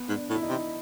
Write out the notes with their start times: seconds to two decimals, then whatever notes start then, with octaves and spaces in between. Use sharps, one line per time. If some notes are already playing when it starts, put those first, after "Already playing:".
Already playing: B3
0.09 G#2
0.16 D4
0.30 A2
0.35 E4
0.43 D#4
0.49 C3